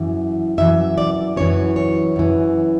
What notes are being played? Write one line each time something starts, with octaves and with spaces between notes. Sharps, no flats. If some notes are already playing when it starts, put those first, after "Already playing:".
Already playing: F#2 E3
F#2 E3 E5
D5
F#2 E3 C#5
C#5
F#2 E3